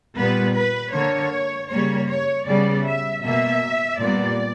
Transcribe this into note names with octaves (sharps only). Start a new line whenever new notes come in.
A#2 G3 B3 B4
B4
D3 A#3 C#5
C#3 G3 A#3 C#5
C#5
C#3 G3 B3 D5
E5
B2 A#3 E5
A#2 G3 B3 D5